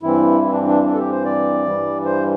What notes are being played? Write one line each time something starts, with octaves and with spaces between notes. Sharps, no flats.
G2 E3 C4 E4
E4
D4
D4
D4
A4
G4
C5
D5
G2 E3 G3
C5